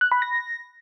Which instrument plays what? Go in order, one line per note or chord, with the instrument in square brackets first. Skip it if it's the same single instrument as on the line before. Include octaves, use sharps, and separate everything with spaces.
[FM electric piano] F#6
B5
A#6